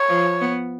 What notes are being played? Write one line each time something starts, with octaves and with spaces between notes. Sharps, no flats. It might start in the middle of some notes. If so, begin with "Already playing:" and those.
Already playing: C#5
F3
B3